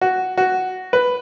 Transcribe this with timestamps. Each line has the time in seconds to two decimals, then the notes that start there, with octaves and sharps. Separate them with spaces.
0.01 F#4
0.37 F#4
0.93 B4